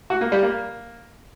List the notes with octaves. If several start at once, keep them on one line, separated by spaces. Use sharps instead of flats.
F#4
A#3
G3
A#3